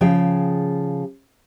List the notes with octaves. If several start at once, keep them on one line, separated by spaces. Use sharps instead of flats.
C#3 F3 G#4 G5